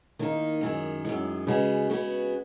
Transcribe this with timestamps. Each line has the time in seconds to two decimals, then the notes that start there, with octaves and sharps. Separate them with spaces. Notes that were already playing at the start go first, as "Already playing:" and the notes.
0.19 D#3 A#3 D#4
0.61 F#2 D#3 G#3
1.05 F#2 D#3 G#3
1.47 C#3 G#3 B3 F#4
1.90 C#3 G#3 B3 F#4